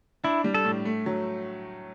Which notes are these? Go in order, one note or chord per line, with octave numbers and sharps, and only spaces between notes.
D4 E4
G3
A4
A2
A3
F#3